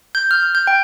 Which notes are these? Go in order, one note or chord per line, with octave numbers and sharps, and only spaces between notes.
G6
F6
G6
G5